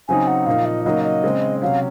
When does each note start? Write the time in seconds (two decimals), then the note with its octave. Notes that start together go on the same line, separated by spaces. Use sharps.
0.08 C#3 F#3 C4 D#4 G#5
0.27 F#5
0.46 A#2 F3 A#3 D#4 F5
0.65 D#5
0.85 C#3 F#3 A#3 D#4 D#5
1.04 D#5
1.24 C#3 G#3 C4
1.62 C3 F#3 C#4 F5